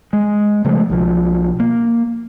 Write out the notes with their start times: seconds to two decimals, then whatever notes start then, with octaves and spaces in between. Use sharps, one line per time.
0.13 G#3
0.65 C#3 F3 G#3 A3
0.90 B1 F3
1.60 A#3